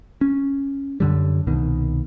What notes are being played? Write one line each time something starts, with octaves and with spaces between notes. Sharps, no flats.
C#4
F#2 D3 G3
C2 B2 D#3